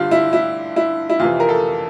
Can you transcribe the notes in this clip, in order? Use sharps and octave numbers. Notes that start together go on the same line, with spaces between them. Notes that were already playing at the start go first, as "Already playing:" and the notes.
Already playing: G2 D3 F4 G4
E4
E4
E4
E4
F2 C3 E3 F4
A#4
A4